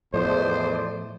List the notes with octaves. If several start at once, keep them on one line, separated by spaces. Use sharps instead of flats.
E2 A2 F3 A4 C5 D5 D#5